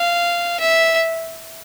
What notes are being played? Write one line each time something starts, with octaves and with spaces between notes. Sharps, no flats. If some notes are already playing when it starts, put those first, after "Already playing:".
Already playing: F5
E5